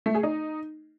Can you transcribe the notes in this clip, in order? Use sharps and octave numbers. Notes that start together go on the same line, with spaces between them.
A3
G#4
D#4